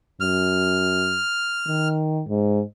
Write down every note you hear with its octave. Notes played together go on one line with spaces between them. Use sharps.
F#2 F6
D#3
G#2